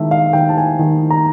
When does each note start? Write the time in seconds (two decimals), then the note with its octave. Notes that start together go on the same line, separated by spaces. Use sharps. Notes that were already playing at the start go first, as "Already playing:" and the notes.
Already playing: D#3 G#3 E5 A5
0.11 F5
0.33 D#3 G5
0.49 A5
0.57 G#5
0.79 D#3
1.11 A#5